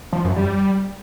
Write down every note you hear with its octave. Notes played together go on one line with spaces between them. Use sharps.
F3
F#2
G3